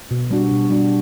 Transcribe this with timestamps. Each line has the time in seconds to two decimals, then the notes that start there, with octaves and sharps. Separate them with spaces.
0.11 B2
0.31 G3 D4 F#4
0.51 B2
0.70 G3 D4 F#4